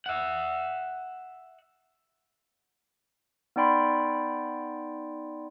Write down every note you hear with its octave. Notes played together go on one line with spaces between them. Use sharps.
E5 F#5
B3 D#4 D5 G5 B5 C6